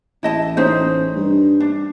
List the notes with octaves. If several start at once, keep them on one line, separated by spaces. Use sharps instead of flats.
A1 E4 D#5 A5
C#4 D#4 C5
G2
D4